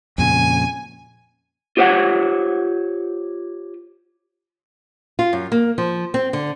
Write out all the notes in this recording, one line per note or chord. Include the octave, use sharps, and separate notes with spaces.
F2 A#2 C#3 G#5
F4 G4 C5 C#5 F#5
F4
F#2
A#3
F3
C4
D3